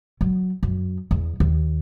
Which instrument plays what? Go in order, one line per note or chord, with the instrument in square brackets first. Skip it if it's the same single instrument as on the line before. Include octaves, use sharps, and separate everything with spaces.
[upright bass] F#3
F#2
E2
D#2